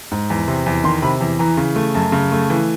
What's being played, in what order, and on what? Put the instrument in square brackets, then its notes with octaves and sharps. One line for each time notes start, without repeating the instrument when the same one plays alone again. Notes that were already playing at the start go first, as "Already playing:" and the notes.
[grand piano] G#2
E2
C3
E2
D#3 C6
C3 B5
E2
E3 A#5
C#3
A3
F#2 A5
C#3
A3
E3